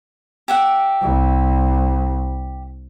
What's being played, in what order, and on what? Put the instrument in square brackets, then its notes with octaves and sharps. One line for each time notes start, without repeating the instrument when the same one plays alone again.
[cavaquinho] G4 E5 F#5
[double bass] C2